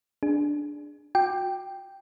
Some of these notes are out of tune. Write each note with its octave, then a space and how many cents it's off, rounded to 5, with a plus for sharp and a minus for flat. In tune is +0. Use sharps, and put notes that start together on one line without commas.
D4 +0 G#4 +0
F#4 -25 G5 +0 D6 +15